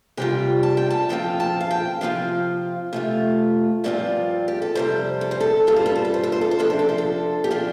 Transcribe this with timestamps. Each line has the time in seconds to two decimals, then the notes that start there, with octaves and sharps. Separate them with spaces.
0.17 C3 G3 F4 G5
0.63 A5
0.77 G5
0.90 A5
1.09 F2 F3 C4 F4 G5
1.40 A5
1.60 F5
1.71 G5
2.01 C3 F3 C4 F4 F5
2.93 C3 A3 F4
3.84 G2 F3 C4 F4 D5
4.48 G4
4.62 A4
4.75 F2 C3 G3 C5
5.21 A4
5.31 C5
5.40 A4
5.67 G2 G3 F4 A4
5.76 C5
5.86 A4
5.96 C5
6.05 A4
6.14 C5
6.24 A4
6.32 C5
6.41 A4
6.51 C5
6.59 F2 C3 F3 D4 A4
6.70 C5
6.79 A4
6.89 C5
6.98 A4
7.44 G4
7.51 F3 D4 F4